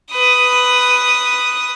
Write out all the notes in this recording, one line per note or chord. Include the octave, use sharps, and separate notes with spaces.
B4 D#6